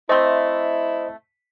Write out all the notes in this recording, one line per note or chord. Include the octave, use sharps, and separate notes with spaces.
A3 C4 E4 C5 D#5